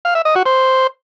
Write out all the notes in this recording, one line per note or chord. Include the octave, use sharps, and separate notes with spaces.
F5
E5
D#5
F#4
C5